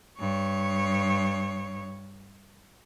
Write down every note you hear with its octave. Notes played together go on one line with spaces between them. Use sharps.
G2 C#5